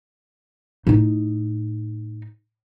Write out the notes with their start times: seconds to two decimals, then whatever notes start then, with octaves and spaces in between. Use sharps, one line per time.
0.87 A2 D#4